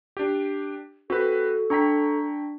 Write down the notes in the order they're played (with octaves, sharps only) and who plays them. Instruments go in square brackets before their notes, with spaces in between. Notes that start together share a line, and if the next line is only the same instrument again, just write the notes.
[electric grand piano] D4 G4
[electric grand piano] C4 B4 [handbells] F#4 [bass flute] A4
[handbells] D4 B6 [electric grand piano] G5 A#5 C#6